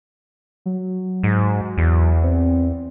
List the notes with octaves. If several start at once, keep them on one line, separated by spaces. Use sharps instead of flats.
F#3
G#2
E2
C4